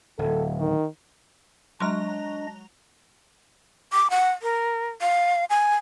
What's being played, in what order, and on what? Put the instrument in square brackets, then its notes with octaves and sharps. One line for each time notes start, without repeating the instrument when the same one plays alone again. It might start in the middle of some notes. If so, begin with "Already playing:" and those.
[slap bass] D1 [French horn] A4
[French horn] D#3
[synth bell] F#3 A#5 [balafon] G#3 C6 [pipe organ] D4 D#5
[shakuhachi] D6
F#5
A#4
F5
G#5